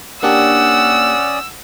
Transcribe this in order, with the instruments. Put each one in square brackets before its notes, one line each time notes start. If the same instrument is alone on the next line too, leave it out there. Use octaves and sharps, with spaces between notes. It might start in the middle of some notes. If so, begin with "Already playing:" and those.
[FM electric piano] A#3 D4 G4 [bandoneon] C#4 D5 D#6 [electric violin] F#5 [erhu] E6